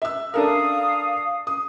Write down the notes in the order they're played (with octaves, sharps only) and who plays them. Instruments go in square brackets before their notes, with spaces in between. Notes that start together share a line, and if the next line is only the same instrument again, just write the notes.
[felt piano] E5 E6
[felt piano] D4 A4 A#4 [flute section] F5 D#6
[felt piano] D#6